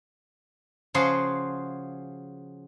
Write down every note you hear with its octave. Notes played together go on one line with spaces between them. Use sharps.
C#3 F3 F4 F#4 G#4